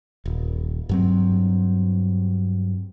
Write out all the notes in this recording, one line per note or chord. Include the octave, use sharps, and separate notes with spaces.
D#1
G2 F#3 C4